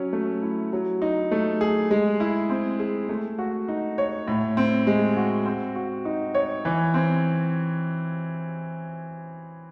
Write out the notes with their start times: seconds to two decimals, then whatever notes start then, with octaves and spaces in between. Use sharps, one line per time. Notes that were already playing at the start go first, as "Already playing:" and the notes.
Already playing: F#3 C#4
0.13 A3
0.42 E4
0.73 F#3
1.02 D#4
1.31 A3
1.61 G#4
1.91 G#3
2.20 E4
2.50 C4
2.80 G#4
3.09 A3
3.38 F#4
3.68 D#4
3.98 C#5
4.28 A2
4.57 C4
4.87 G#3
5.17 F#4
5.46 C4
5.75 F#4
6.05 D#4
6.35 C#5
6.65 E3
6.94 C4